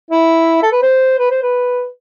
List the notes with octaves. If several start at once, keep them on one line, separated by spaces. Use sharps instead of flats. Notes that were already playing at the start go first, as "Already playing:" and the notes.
E4
A4
B4
C5
B4
C5
B4